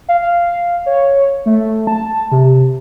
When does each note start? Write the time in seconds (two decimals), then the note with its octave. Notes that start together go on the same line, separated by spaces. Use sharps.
0.09 F5
0.86 C#5
1.46 A3
1.87 A5
2.32 C3